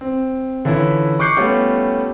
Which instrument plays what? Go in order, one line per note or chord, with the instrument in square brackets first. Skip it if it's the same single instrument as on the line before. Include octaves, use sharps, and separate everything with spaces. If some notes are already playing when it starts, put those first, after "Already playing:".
[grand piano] C4
D3 E3 C#4 E4 F4
C#6 D6 F#6 G6 C7 C#7
G3 A3 B3 C#4 F4